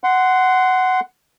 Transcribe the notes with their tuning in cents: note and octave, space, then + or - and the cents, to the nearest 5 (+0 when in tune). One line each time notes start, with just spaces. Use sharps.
F#5 +10 C6 -15